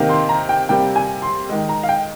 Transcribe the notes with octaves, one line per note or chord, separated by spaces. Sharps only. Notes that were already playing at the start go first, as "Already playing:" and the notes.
Already playing: C3 D#3 A#3
C6
A#5
G5
C3 G3 A#3 G5
G#5
C6
D#3 G#3
A#5
F5
G5